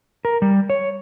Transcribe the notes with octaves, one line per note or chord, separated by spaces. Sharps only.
A#4
G3
C#5